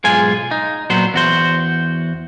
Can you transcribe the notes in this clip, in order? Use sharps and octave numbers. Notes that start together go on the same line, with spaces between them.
B1 G#2 G#3 F4 G#5
D#4
A#2 F#3 B3 C5
E2 F#4 C5